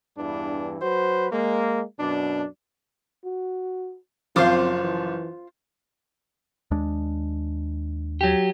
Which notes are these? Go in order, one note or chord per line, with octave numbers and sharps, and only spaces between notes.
E2 G2 E3 D4
F#3 F#4 B4 C5
G#3 A#3
F#2 B2 D4
F#4
F#1 F3 C4 F4 C5 F5 D6
E3
D#2 G#3 D4
F#3 G4